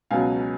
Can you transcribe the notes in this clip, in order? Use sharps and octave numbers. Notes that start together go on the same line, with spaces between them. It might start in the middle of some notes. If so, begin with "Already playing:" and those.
C#2 B2 F#3 F5 G#5